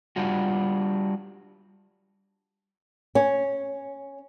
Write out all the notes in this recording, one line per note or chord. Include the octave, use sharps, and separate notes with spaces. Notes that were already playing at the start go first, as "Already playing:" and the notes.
G3 D4 F4 F#4
C#4